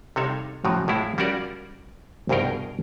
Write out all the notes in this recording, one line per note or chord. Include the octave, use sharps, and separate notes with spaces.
C3 G3 D#4 A4 C#5 F5
A2 C#3 F3 F#3
A2 G#3 E4 F4
G3 C#4 F4 F#4 A#4 D5
C2 G2 B2 G#4 A#4 G5